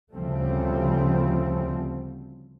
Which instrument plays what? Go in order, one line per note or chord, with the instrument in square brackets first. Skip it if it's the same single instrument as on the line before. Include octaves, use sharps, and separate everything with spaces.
[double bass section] D2 C#3 F3 G3 A3 C4